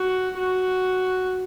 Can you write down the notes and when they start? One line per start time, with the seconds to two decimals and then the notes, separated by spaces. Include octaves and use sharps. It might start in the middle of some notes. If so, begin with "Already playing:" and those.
Already playing: F#4
0.37 F#4